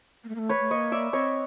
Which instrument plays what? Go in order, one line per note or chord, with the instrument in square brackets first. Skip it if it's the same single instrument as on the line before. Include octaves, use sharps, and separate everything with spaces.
[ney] A#3
A3
A#3
A3
[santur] B4 C#5
[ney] A3
[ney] A#3 [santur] C#5 D#5
[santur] D5 E5
[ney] C4 [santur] C#5 D#5